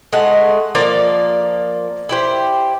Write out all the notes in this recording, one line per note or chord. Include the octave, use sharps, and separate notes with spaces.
G#3 A3 F#5
F3 A#3 D5
E4 G4 C5